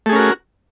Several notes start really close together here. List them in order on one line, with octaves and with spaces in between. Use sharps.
A3 G#4 C#4 A#4 F#4